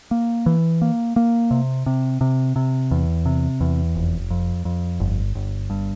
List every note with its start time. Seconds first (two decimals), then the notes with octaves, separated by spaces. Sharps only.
0.11 A#3
0.46 E3
0.82 A#3
1.16 A#3
1.51 C3
1.86 C3
2.21 C3
2.56 C3
2.91 E2
3.26 C3
3.61 E2
3.95 F1
4.30 F2
4.65 F2
5.00 G1
5.35 G1
5.70 G2